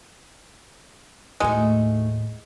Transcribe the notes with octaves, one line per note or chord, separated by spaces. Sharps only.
D#2 A2 G#3 A3 D#4 F#4